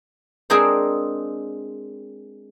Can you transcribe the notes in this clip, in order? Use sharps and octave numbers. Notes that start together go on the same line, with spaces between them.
G#3 C4 D4 G#4 A#4 C5